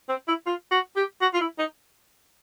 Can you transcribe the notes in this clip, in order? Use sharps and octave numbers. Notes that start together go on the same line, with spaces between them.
C4
E4
F4
F#4
G4
F#4
F4
E4
D#4